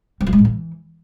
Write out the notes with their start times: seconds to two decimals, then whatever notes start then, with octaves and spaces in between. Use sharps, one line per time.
0.21 G3
0.27 F3
0.33 G#3
0.39 A2
0.45 E3